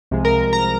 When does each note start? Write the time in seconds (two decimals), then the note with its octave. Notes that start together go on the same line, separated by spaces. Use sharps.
0.11 C2 C3 F3 G#3
0.25 A#4
0.53 A#5